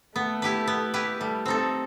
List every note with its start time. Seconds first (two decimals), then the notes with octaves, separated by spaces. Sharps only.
0.16 A3 B3
0.42 E4 G4 B4
0.68 B3
0.94 E4 G4 B4
1.20 G3 A3
1.46 C4 D#4 A4